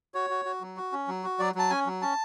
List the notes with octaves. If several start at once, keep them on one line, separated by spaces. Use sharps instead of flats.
F#4 C#5
F#4
F#4
F#3
F#4
C#4
F#3
F#4
F#3 D5
F#3 A5
C#4 G#5
F#3
C#4 A5